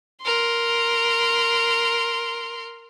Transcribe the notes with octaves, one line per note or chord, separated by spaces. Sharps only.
A#4 C6